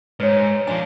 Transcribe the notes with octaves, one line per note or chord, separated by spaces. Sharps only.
G#2 B4 C#5
F3 D4 G#5